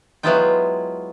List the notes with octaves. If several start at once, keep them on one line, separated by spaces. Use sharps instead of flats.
F#3 G#3 B3 E4 F4 G5